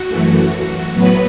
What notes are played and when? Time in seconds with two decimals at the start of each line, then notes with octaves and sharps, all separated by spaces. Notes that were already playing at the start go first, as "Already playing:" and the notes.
Already playing: F#4
0.08 F#2 E3 A3
0.93 A2 F#3 B3 B4